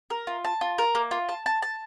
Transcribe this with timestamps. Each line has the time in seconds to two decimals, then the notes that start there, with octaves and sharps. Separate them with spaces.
0.10 A#4
0.27 F4
0.45 A5
0.61 F4
0.78 A#4
0.95 A#3
1.11 F4
1.29 A5
1.46 A5
1.62 A5